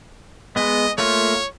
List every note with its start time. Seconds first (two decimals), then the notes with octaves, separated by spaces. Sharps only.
0.56 G#3 B3 D#5
0.98 A3 A#3 F4 C#5